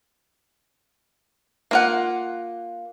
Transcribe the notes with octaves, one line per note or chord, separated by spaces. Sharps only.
A#3 F4 F#5